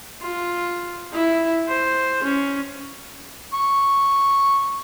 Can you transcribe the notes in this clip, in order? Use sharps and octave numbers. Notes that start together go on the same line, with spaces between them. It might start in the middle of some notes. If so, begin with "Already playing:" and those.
F4
E4
C5
C#4
C#6